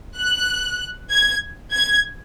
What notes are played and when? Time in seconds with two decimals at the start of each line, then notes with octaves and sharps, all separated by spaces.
0.17 F#6
1.12 G#6
1.74 G#6